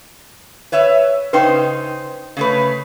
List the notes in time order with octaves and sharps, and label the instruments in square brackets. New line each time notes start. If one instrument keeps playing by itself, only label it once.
[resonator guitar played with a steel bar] B4 C#5 E5
[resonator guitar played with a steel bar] C#3 D#4 C5 [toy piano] B4 G5 C6
[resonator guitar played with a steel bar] C#3 A3 B4